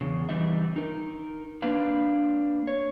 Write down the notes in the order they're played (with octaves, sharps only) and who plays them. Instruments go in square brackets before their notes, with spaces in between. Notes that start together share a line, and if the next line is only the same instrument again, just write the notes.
[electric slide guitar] E2 C#3
E3 G3 C4 D#4 E5
D#4 A#4
A#3 C4 D4 B4 F5
C#5